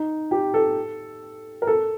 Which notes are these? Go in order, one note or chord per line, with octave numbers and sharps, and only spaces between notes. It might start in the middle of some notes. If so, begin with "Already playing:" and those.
Already playing: D#4
G4
A4
A#4
A4